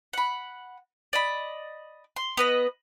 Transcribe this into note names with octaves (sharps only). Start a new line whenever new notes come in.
F#5 B5
D5 D#5 B5
C6
B3 B4 D#5